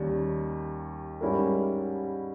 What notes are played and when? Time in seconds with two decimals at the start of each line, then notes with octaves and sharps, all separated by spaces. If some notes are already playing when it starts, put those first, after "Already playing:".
Already playing: D#2 D#3 G3 C#4
1.21 G#2 G3 C#4 E4 A#4